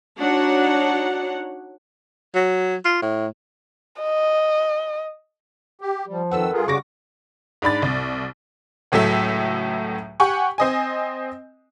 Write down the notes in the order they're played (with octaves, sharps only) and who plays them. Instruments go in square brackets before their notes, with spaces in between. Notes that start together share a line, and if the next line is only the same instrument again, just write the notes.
[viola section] D4 D#4 F#4 C#5 F#5
[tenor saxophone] F#3
F4
A2
[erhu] D#5
[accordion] G4
[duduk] F3 [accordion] G3
[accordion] F2 D#3 E6 [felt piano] A4 B4 F#5
[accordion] G2 F4 G#4 [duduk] A#4
[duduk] C#3 [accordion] G3 F#4 D6 [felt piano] C#6 A#6
[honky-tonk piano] G#2 D4 B5 A6
C2
C#2 A2 F#3 A3 E5
G4 F#5 G#5 C#6
C4 D#5 G#5